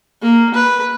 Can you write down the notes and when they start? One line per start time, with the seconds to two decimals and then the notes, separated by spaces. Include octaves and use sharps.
0.22 A#3
0.54 B4